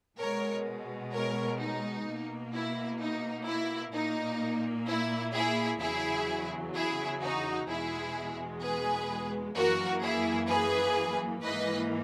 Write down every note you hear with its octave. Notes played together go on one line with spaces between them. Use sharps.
B2 G#3 A#4 C#5
A#4 C#5
D#4
B2 A#3
E4
D#4
E4
A#2 A#3 D#4
E4
E4 G#4
E2 C#3 F#3 E4 G#4
E4 G#4
D#4 F#4
E2 B2 G#3 E4 G#4
G#4 B4
F#2 E3 A#3 F#4 A#4
E4 G#4
G#4 B4
G#2 E3 A#3 B4 D#5